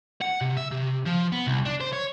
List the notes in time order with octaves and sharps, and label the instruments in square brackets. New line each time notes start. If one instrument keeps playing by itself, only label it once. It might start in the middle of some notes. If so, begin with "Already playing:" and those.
[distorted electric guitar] F#5
C3
E5
C3
F3
B3
C2
D4
C5
C#5